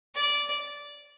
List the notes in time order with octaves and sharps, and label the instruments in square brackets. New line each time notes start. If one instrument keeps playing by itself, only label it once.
[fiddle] D5